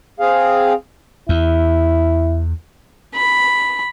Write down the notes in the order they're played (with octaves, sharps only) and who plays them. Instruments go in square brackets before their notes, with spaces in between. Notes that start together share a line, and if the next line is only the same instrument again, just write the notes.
[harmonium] C4 G#4 F5
[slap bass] E2 [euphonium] E4
[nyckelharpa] B5